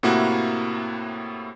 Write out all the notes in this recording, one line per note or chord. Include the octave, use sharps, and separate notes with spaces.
A2 C3 A#3 E4 F#4